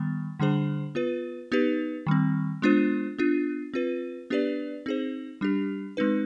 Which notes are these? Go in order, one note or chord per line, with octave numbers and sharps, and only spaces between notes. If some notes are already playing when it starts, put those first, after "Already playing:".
Already playing: D#3 G3 B3
D3 G3 D4 G#4 C5
B3 F4 B4
B3 D#4 G4 B4
D#3 G3 C4
G#3 B3 D4 F4 C5
B3 D4 F4
C4 F4 B4
B3 D4 G4 B4 D5
C4 D#4 G#4 C5
G3 D4 G4
G#3 C4 D#4 B4